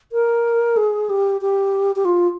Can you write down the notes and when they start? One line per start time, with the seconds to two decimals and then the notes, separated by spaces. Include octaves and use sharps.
0.12 A#4
0.77 G#4
1.10 G4
1.41 G4
1.96 G4
2.05 F4